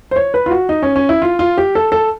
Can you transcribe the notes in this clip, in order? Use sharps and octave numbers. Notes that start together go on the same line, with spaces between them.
C5
C#5
B4
F4
F#4
D#4
C#4
C#4
E4
F4
F4
G4
A4
A4